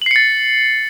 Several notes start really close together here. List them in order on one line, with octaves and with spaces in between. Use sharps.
F#7 C7 C#7 A6